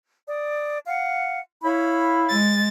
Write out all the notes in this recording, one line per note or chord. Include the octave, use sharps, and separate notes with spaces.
D5 D#6
F5 F#5
E4 C#5 F5 B5
G#3 A6